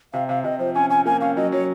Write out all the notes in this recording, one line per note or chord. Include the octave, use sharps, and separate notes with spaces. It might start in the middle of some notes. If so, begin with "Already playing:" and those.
C3 F5
C3 F5
C3 D#5
F3 C5
C#4 G#5
C#4 G#5
A#3 G#5
C#4 F5
F#3 D#5
F#3 C#5